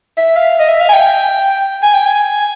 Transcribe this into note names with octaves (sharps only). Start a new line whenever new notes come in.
E5
F5
D#5
E5
F5
G#5
G5
G#5
G5
G#5